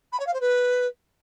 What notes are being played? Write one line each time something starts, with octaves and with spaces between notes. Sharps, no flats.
B5
C#5
F5
C5
B4